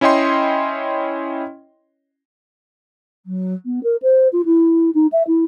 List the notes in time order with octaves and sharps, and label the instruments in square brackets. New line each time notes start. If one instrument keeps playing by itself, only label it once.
[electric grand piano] C#4 E4 C#5 D#5 G5 C6
[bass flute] F#3
B3
A#4
C5
F4
E4
D#4
E5
E4